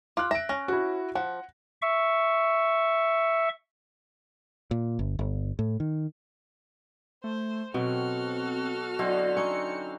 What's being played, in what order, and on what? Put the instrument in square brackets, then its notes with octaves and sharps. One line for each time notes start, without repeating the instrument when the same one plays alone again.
[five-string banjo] F4 [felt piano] D6 F#6
[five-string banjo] E5 [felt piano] A#6 D7
[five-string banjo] C#4 [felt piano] A#6
[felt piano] E4 F#4
[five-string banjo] F3 [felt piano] F#5
[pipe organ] E5 C#6
[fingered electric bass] A#2
G1
G1
A2
D#3
[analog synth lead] A3 [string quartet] C5
[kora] B2 F#3 [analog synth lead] C4 [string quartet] F#4 A4 F6
[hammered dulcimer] D3 C4 E4 [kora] F#3 [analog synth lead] D#5
[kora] C#4 D#4 [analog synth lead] C#7